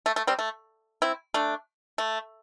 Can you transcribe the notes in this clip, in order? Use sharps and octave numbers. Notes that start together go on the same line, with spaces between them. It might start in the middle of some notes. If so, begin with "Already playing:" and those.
A3
A3
G3 C4
A3
C4 E4
A3 D4
A3